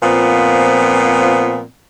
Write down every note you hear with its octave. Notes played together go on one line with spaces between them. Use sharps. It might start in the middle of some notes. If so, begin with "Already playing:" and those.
A#2 F3 B3 C4